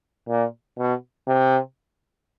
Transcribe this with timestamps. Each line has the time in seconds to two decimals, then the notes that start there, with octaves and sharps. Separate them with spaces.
0.29 A#2
0.79 B2
1.28 C3